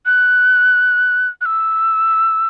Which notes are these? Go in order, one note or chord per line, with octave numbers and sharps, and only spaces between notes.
F#6
F#6
E6